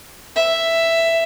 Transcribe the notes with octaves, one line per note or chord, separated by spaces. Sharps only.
E5